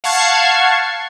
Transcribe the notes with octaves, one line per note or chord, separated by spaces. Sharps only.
F5 F#5 A5 C#6 G#6 C7